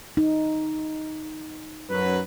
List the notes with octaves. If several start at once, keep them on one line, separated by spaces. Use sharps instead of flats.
D#4
F#2 F#3 B4